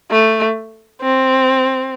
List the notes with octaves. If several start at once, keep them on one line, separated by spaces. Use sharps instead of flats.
A3
C4